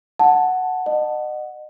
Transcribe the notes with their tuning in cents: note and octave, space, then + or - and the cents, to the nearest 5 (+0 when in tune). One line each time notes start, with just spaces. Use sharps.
F#5 +0 A5 +0
D#5 -35 F#5 +0